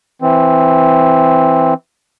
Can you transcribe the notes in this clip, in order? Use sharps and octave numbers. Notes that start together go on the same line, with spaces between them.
E3 C4